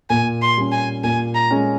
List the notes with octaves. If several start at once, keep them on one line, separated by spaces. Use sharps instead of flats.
A#2 G#5
C6
G3 C#4
G#5
A#2 G#5
A#5
G#3 C#4